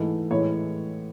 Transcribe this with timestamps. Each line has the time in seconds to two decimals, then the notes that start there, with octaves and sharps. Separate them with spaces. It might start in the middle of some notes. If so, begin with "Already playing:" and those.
Already playing: G#2 E3 A3
0.31 A2 E3 G#3 C#5